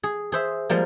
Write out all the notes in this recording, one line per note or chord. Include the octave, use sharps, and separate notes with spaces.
G#4
G#4 C5 E5
F3 G3 G#3 A#3